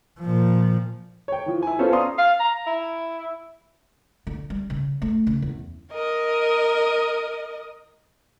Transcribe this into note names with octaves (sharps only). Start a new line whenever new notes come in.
A#2 F3
C#5 G5
E3 F3
E4 G#5
B3 C#4 F4 A4 C5
D5 F5 A#5 C6 D#6
F5
A#5
E4
D3
G3
C#3
A3
C#3
E2
A#4 D#5